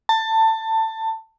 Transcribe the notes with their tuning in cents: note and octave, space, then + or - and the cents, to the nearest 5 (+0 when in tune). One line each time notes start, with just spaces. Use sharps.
A5 +20